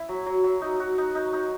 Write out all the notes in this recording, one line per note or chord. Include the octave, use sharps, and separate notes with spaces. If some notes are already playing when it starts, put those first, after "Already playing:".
Already playing: E4
F#3
F#3
F#3
D#4
F#4
D#4
D#4
D#4